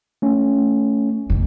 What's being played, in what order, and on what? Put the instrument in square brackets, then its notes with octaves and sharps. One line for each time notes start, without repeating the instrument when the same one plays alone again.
[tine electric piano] A3 C#4
[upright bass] F2 B2